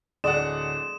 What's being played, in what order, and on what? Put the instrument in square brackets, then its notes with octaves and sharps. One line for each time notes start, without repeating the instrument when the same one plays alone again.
[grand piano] D1 D4 F#5 [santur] G#3 [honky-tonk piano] D5 [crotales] E7